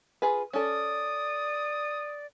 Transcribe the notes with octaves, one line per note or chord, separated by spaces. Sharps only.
F4 G#4 B4
C#4 A4 D5 D#6